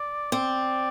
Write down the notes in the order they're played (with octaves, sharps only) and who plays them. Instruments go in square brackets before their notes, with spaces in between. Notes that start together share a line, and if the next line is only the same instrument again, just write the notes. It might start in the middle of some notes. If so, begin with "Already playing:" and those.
Already playing: [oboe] D5
[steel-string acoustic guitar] C4 [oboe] D5